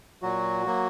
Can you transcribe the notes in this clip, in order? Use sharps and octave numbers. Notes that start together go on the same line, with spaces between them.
A#2 F#3 F#4
F#3 A#3